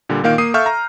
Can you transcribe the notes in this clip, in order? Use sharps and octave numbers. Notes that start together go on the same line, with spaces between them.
A#2 D3 G3
A#2 D#3 A#3 F5 G6 D7
A#3 D#6 C7 D#7
A4 E5 F5 C#6 F6 G6
A#5